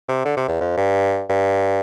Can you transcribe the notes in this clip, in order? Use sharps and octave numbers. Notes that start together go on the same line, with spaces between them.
C3
D3
C3
E2
F2
G2
G2